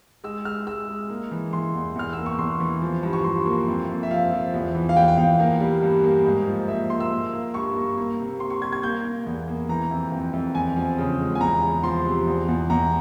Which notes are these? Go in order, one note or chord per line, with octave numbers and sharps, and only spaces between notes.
G#3 E6
G#3 F6
G#3 E6
G#3
A#3
E3
E3 C6
E2
E2 F6
A#3 E6
C#6
E2 C6
E3
F3
G2
C#6
G2 C6
A#3
F2
F2
E5
F3 F5
F3
E2
E3
F5
E2 G5
G5
E2 F5
A#3 F5
G3
G2
A#3
G#2
F3
A#3 E5
A#3 C6
E6
A#3
A#3
G2 C#6
A#3
A#3
C3
C3 C6
C#6
G3 G#6
G#6
A#3 G6
A#3
E2
A#3
E3 A#5
F2
F2
F2
E2 G#5
F3
C#3
G#3
G#5
E2 A#5
E2
F3 C6
C3
E2
E2
E2 A#5